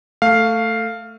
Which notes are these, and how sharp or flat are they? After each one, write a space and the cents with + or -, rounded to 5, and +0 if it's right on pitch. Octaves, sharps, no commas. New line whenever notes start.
A3 +15 F5 +0